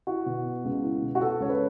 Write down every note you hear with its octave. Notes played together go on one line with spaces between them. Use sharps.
E4 F#4
B2
B3
C#2
E4
B2
F#4
B3 A4
C#2 C#5
B4